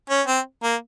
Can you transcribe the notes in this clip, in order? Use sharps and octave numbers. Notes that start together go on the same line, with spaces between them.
C#4
C4
A#3